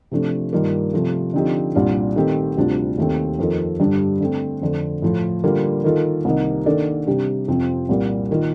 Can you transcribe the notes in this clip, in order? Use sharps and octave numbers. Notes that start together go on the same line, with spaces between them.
C3 F3 A3 D4
G2 D#3 A#3 F4
C3 F3 A3
D3 F3 C4 D#4 G4
C2 A#2 G3 D4 F4
D#3 A3 C4 G4
D2 C3 G3 D4 F4
D#2 D#3 A3 C4
F2 D#3 A#3 F4 A4
G2 D3 G3 D4 G4
D3 A3 C4
F2 D3 A3
A2 F3 A3
D3 G3 A#3 F4
D#3 A#3 F4 A4
C2 C3 D#3 A#3 D#4
D#3 A#3 D4 A4 D5
C3 G3 D4 G4
F2 C3 F3 C4
C2 A#2 G3 A#3
D#3 A#3 F4